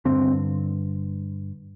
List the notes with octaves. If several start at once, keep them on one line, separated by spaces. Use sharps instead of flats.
G2 D3 C4